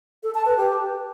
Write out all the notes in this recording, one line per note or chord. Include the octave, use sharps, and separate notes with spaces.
A4
A5
B4
G4